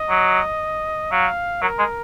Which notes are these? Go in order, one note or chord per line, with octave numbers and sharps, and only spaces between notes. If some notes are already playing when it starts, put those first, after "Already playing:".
Already playing: D#5
F#3
F#3 F5
F#3 A#4
G#3